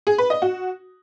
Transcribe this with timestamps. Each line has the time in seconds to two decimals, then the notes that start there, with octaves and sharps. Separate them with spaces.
0.07 G#4
0.18 B4
0.30 D#5
0.42 F#4